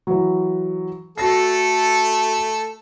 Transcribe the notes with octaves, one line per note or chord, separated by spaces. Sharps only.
E3 F#3
A3 F#4 A4 A#6 C7